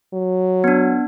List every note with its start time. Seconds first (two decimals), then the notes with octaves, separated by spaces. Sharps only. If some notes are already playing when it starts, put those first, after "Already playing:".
0.14 F#3
0.64 B3 D4